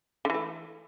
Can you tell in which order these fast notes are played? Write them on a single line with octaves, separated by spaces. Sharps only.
D3 E3 A3